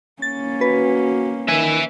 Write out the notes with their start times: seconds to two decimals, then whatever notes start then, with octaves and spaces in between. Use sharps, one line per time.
0.22 A#3 C#4 A6
0.61 F#4 B4
1.48 D#3 E5 G#5